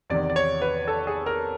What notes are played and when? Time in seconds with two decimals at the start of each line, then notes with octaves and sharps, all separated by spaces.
0.10 E2 C3 D#3 D5
0.30 D5
0.36 C#5
0.62 B4
0.88 A4
1.07 G#4
1.26 A#4